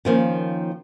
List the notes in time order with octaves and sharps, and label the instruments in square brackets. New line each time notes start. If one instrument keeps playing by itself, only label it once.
[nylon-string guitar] D#3 F3 A#3 C#4